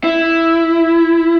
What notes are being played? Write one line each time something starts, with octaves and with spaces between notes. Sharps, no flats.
E4